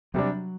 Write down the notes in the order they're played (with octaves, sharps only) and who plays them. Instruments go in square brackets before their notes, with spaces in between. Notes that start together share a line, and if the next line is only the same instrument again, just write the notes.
[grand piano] C3 G3 D4 [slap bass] F#3